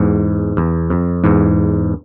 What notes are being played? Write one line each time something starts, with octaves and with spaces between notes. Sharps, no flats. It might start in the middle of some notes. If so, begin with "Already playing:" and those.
Already playing: E2 G#2
E2
F2
E2 G#2